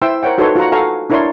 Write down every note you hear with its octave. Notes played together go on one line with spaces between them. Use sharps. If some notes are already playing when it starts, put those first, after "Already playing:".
E4 C5 E5 G5 C6 E6
A#4 C5 C#5 F#5 G5
D#4 F#4 A4 B4 C#5 C6
F4 F#4 F#5 A#5
F#4 A4 F5 G#5 A#5 C#6
D4 E4 A#4 C#5 D5 C6